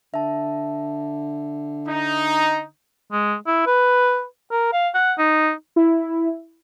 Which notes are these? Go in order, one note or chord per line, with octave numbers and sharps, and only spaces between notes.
D3 E5 A5
D#4
G#3
E4
B4
A#4
F5
F#5
D#4
E4